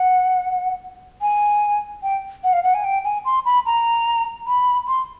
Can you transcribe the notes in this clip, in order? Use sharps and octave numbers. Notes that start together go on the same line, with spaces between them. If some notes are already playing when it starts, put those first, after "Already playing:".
Already playing: F#5
G#5
G5
F#5
F5
F#5
G#5
G5
G#5
C6
B5
A#5
B5
C6